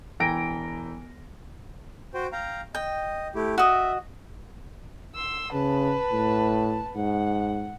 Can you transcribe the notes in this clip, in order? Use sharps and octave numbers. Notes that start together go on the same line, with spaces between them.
E1 E3 G5 A#5 A#6 D7
F#4 C5 G5
F5 G5 A#5
D#5 G5
A3 E4 G4
F#4 D#5 E5
C6 E6
C#3 B4 A5
A2
G#2 F#5